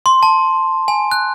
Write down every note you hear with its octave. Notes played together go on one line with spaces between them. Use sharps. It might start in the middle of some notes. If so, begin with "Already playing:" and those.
C6
A5
G#5
F#6